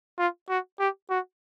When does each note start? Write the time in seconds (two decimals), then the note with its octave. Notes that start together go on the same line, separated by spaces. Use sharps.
0.18 F4
0.49 F#4
0.79 G4
1.10 F#4